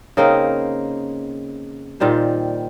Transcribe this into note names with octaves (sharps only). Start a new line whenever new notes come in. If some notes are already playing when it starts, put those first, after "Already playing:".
C#3 A#3 C4 D#4
A#2 D#3 G3 C5